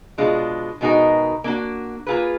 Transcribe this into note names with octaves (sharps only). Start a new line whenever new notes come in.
B2 G#3 D4 F4
B2 G#3 D#4 F#4 A#4
A#3 D4 F#4
A#3 F4 G#4 B4